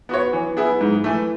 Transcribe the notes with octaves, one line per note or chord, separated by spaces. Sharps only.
B3 F#4 C#5
E3
B3 E4 G#4
G#2
E3 A3